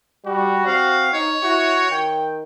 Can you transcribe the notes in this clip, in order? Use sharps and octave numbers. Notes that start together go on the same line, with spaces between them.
G3 F#4
C4 F5
D#4 C#5
E4 F#4
D#3 G5